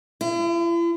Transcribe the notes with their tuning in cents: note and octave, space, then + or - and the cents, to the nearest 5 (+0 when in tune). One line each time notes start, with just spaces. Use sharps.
E4 +45